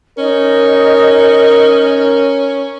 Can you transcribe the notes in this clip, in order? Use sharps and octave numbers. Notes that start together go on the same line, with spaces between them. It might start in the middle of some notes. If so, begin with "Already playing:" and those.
C#4 D#4 A#4 D#5